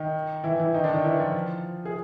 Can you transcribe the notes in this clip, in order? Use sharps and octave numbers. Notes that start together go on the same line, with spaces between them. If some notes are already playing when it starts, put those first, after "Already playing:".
Already playing: D#3 D#4
E3 E4
E3 E4
D#3 D#4
D3 D4
D#3 D#4
E3 E4
F3 F4
G#4